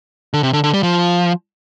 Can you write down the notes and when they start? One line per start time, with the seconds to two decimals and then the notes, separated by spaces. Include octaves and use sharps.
0.34 D3
0.43 C3
0.53 D3
0.64 D3
0.74 G3
0.83 F3